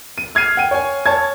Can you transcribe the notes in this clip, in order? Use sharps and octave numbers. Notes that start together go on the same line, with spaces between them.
D#7
F6 G#6 C7 D#7
F#5 G5 D#7
C#5 G#5
C#5 A5 G#6